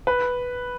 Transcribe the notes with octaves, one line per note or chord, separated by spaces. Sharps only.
B4